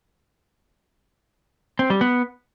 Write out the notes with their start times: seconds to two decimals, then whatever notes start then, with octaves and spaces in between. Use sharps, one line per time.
1.79 C4
1.90 G3
2.01 B3